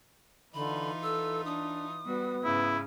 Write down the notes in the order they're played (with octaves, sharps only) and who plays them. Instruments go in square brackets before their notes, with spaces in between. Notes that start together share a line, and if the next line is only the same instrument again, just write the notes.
[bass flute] D3 [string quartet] E3 D#4 F4 [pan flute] B5
[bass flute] A4 [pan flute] E6
[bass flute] D4 [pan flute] D#6
[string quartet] G3 F#4 [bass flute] B3
[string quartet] G#2 C#3 [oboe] E4